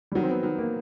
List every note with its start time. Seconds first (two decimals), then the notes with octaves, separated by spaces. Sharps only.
0.12 G3
0.15 D#3 F#3
0.23 C4
0.30 B3
0.43 D#3 B3
0.58 A#3